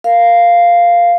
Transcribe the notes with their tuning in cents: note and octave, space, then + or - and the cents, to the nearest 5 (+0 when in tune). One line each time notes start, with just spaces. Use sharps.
A#4 +0 F5 -5